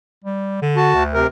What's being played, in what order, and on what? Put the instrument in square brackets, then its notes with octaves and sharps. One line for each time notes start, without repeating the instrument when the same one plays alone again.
[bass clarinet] G3
D3
[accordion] F#4 A5
[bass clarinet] D2
[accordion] C3 A#4